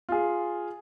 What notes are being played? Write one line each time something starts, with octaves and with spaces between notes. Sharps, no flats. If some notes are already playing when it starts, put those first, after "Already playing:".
F4 G#4